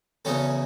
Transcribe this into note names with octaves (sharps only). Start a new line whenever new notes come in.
E2 C#3 F#3 C#4 A4